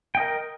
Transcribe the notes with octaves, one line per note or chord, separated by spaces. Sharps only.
A#4 D#5 G5